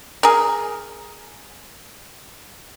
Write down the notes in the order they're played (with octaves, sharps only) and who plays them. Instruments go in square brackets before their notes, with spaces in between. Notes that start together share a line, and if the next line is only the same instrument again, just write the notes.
[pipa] G#4 A#4